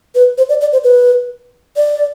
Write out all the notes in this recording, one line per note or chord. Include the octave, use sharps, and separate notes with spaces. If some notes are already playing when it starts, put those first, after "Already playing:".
B4
C5
D5
D5
C5
B4
D5